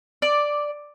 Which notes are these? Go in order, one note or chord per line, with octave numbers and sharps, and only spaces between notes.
D5